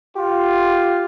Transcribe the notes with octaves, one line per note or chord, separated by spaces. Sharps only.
F4 G4